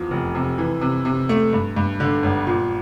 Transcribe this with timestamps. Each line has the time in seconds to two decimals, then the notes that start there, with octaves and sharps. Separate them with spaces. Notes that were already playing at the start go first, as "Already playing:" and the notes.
Already playing: E2 F3
0.11 F1
0.35 C3
0.58 E3
0.81 C3
1.05 C3
1.29 A3
1.53 G2
1.76 G2
2.00 D3
2.23 G1
2.47 A#2